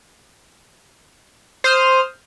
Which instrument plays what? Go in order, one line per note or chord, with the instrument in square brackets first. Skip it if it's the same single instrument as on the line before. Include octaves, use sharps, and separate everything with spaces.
[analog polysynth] C5 D#6 F6